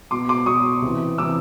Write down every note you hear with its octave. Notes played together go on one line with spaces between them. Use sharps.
B2 C6 D6
C6 D6
B2 C#6 D#6
C3 E3
C3 E3 D6 E6